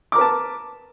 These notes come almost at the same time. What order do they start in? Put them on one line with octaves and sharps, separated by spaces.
D6 A#4 B4 A5